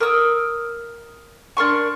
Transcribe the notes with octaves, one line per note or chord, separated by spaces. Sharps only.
A#4 D#6 E6
D4 A#4 C6 C#6